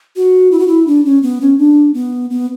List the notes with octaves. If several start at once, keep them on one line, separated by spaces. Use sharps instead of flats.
F#4
E4
F#4
E4
D4
C#4
B3
C#4
D4
B3
B3